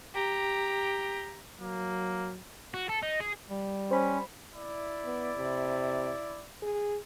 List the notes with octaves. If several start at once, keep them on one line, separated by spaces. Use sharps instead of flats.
G4 A#5
F#3 A#3
F#4
A4
D#4
G#4
G3
C#4 C5 B5
E4 D5
B3
C3
G#4